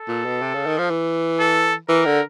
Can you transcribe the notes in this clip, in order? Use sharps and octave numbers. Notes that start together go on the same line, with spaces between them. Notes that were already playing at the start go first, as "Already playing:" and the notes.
Already playing: A4
A#2
B2
C3
C#3
D#3
F3
E3
A4
E3 A#4
D3